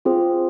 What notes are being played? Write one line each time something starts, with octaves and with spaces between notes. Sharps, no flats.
C4 F4 G#4 C5